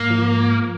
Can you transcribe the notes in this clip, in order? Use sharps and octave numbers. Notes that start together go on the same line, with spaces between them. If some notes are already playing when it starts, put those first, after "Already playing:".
Already playing: G#2 A#3
F3